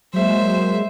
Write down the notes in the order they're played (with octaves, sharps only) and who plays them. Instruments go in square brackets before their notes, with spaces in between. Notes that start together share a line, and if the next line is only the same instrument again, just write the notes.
[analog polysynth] F#3 G#3 A#3 [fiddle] C5 E5